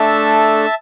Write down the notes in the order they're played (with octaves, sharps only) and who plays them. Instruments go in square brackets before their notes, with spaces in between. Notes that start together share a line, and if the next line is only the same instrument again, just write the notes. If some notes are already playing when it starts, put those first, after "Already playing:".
Already playing: [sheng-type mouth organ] A3 D4 A4 E5 A5